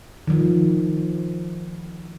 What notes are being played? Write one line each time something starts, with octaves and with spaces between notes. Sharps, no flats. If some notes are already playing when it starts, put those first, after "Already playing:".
D#3 F3